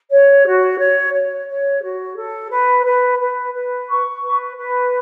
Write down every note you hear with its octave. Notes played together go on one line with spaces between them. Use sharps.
C#5
F#4
C#5
C#5
C#5
F#4
A4
B4
B4
B4
B4
C#6
B4
B4